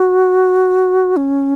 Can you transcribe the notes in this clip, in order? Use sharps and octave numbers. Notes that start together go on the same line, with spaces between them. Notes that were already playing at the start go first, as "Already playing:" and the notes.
Already playing: F#4
C#4